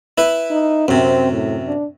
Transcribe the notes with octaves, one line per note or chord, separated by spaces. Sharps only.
E4 B4
D#4
F#2 C3 C4
A2
D4